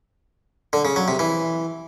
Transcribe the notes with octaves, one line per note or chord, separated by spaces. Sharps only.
D3
C#3
F#3
C3
E3